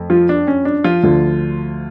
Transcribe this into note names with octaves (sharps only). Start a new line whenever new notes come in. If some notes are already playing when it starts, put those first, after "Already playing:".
Already playing: F2 A3
F3 F4
D4
C#4
D4
F3 F4
D2 D3 F3